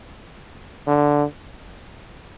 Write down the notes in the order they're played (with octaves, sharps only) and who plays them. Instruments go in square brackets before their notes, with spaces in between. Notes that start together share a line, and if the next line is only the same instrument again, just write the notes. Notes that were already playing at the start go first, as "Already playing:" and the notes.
[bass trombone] D3